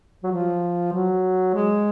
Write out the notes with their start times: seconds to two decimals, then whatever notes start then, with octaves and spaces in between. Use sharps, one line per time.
0.24 F#3
0.32 F3
0.93 F#3
1.54 G#3